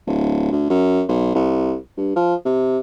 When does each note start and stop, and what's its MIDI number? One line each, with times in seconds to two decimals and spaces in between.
0.07 0.51 26
0.52 0.68 38
0.70 1.03 42
1.09 1.31 35
1.35 1.76 36
1.97 2.15 43
2.16 2.35 53
2.45 2.79 48